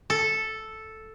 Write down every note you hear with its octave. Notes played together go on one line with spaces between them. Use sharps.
A4